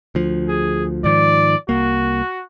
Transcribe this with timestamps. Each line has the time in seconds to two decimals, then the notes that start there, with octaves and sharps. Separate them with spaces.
0.15 D2 F3
0.48 G#4
1.04 G#2 D#3 F3 D5
1.69 C2 A#3 F#4